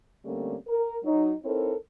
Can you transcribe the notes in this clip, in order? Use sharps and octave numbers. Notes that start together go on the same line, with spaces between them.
D3 G3 A3 A#3 C4 C#4
A#4
F#3 D#4
C4 D#4 E4 A4 A#4 C#5